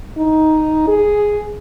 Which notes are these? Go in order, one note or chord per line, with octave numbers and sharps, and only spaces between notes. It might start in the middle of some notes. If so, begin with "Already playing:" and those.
D#4
G#4